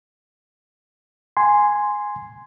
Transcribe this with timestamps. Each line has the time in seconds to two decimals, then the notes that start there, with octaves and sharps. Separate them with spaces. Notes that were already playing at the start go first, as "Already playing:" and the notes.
1.37 G#5 C6